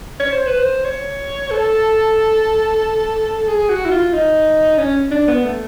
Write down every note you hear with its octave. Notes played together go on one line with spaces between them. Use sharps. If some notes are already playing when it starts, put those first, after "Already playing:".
C#5
C5
B4
C5
C#5
A4
G#4
F#4
E4
F4
D#4
C#4
D4
B3
A3